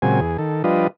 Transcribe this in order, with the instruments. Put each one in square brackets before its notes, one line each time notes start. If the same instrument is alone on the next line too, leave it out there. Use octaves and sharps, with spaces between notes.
[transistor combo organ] A#2 C#3 F#3 G#3 C4 G#5
E2 G#4
D#3 A4
F3 G3 D4 F4 B4 D#5